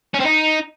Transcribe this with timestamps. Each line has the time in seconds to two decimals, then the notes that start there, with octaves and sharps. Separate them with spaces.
0.14 C#4
0.20 C4
0.26 D#4